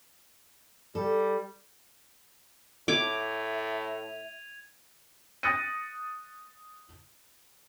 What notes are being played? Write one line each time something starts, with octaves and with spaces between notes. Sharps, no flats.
G3 A4
A2 E5 D6 G#6 D#7 F7
D#6 F#6 A6 A#6 C#7 D#7